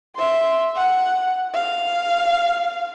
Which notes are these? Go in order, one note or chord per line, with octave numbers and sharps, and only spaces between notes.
E5 C6
F#5
F5